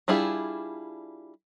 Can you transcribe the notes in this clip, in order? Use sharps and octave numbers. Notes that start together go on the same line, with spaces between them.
G3 D4 E4 F4 G#4